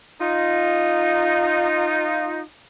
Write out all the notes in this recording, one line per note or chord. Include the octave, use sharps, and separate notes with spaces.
D#4 F4